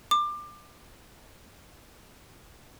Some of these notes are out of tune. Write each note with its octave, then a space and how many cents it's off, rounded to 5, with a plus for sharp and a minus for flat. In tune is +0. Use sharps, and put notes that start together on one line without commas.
D6 +25